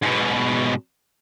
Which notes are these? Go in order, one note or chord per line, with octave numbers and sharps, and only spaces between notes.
G#2 B2